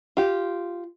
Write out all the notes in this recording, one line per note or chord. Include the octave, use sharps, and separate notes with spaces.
F4 G4